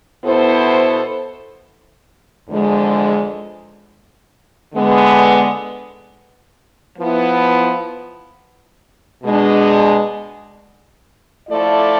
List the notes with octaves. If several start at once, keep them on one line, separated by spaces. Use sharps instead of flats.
B2 B3 E4 A4 C5
E2 D3 F3 G#3
D3 G#3 B3
F3 B3 E4
B2 G#3 D4
F3 A3 E4 A4 D5